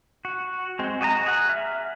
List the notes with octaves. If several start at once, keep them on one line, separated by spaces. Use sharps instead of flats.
F#4
G#3 C4
F#4 D#5 G#5 A#5
G#4 F#5
E5 F6